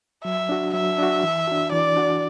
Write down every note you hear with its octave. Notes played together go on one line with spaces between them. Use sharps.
F#3 E5
D4 F#4
F#3 E5
D4 F#4
E3
D4 F#4
E3 D5
D4 F#4